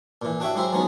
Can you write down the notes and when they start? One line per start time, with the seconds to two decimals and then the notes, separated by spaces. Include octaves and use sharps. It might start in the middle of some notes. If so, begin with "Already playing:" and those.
0.22 A#2 E3
0.40 D4 F#4 G4 C#5 E5
0.55 F#3 G#3 E4 G4 C5 E5
0.72 F3 F#3 G#3 B3 C#4 D#4